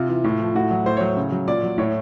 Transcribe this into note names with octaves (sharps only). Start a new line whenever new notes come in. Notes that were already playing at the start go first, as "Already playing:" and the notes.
Already playing: C3 F4
E3
A2
F3
A2 F#4
F#3
A2 C5
F#3 C#5
C#3
F#3
A#2 D5
F#3
A2 C#5